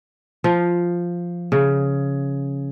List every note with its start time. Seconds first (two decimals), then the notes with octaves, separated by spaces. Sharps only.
0.44 F3
1.52 C#3